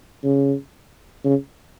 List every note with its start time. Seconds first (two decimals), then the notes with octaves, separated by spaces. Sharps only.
0.24 C#3
1.25 C#3